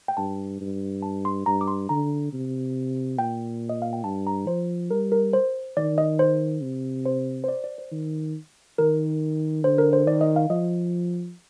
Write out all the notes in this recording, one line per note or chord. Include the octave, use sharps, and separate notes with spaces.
G5
G2 A5
G2
A5
C6
G2 A#5
D6
C6
D3 A#5
C3
A#2 G5
D#5
F5
G5
G2 A5
A#5
F3 C5
G3 A#4
A#4
C5
D#3 D5
D#5
C5
C3
C5
C5
D5
D5
C5
D#3
D#3 A#4
D3 C5
A#4
C5
D#3 D5
D#5
F5
F3 D#5